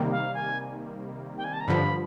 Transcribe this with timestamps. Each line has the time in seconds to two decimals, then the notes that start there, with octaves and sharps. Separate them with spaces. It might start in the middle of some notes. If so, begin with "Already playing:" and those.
Already playing: C3 D#3 G3 A#3
0.11 F5
0.34 G#5
1.37 G5
1.44 G#5
1.53 A5
1.61 A#5
1.68 G2 D3 F3 B5